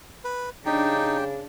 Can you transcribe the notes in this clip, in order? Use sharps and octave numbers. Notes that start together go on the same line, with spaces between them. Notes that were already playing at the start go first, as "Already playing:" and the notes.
B4
C#3 D4 D#4 G4 G5